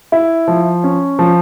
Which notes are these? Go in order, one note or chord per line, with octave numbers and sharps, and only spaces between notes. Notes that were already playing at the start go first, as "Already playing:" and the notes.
E4
F3
C#4
F3